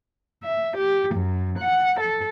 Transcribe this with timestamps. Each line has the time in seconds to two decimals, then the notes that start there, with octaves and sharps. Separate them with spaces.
0.42 E5
0.77 G4
1.14 F#2
1.58 F#5
2.00 A4